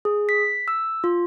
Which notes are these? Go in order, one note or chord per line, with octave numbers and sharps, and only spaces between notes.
G#4
B6
E6
F4